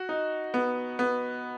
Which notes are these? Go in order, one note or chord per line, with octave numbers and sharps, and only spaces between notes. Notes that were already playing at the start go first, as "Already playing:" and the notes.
Already playing: F#4
D#4
B3
B3